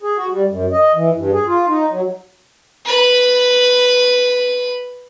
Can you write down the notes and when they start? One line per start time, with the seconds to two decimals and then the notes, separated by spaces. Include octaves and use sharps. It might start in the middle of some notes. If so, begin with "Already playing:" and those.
0.02 G#4
0.17 F#4
0.30 G3
0.48 F#2
0.72 D#5
0.95 E3
1.15 G2
1.33 G#4
1.46 F4
1.68 D#4
1.90 F#3
2.85 B4 B5